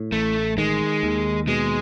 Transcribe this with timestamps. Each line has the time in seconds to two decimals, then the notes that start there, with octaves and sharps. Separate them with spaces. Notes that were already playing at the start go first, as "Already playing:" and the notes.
Already playing: A2
0.12 A1 A3
0.58 D#3 G#3
1.03 D#2
1.48 B2 G#3